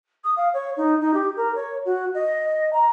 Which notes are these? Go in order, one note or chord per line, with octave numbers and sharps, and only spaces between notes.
D#6
F5
C#5
D#4
D#4
G4
A#4
C#5
F#4
D#5
A#5